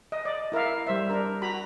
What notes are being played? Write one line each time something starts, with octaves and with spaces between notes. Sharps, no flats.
D#5
D5 D#5
E4 A#4 E5 F5
G3 C5 E5
D4 A#4
F#4 A#5 B5